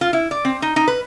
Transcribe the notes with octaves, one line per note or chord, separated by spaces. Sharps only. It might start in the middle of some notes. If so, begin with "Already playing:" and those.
F4
E4
D5
C4
D#4
D#4
B4